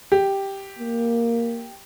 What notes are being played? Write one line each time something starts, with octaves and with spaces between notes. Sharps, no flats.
G4
A#3